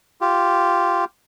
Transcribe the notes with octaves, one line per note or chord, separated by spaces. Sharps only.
F4 G4